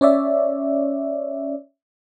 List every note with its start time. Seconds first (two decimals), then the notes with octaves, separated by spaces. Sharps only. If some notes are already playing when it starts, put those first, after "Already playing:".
0.01 C#4 C#5 D5 E5